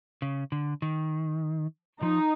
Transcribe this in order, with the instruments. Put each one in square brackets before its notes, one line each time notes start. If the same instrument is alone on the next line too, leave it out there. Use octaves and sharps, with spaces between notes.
[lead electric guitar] C#3
D3
D#3
[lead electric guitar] F3 [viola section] D#4